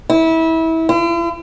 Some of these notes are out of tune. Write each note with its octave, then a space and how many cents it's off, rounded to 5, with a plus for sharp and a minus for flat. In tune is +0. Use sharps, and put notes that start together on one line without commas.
E4 -25
E4 +45